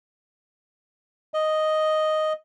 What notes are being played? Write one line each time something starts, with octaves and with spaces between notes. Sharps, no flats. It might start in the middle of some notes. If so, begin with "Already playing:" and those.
D#5